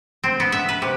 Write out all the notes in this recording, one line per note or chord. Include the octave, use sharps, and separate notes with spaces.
C4
B3
E5
B4
C3